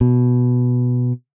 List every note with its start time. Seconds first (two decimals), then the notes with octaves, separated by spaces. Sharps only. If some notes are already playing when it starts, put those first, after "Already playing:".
0.01 B2